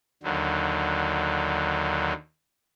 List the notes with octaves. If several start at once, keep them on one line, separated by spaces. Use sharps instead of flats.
D#2 D3 F#3